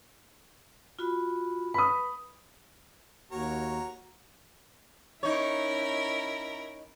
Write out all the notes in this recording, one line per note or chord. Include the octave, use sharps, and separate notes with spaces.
F4 F#4 B5
B4 B5 D#6
D#2 F#4 A#4 C#5 A#5
C#4 D#4 E4 A#4 C#5